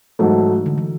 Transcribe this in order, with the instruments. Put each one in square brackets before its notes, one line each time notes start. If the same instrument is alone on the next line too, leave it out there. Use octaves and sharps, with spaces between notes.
[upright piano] G#2 F#3 A3 [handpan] E3
[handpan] D3
E3